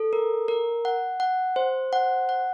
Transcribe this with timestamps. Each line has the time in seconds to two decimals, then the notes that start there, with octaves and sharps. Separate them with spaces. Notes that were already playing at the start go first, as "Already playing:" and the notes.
Already playing: A4
0.13 A#4
0.48 A#4
0.85 F#5
1.20 F#5
1.56 C5
1.93 F#5
2.29 F#5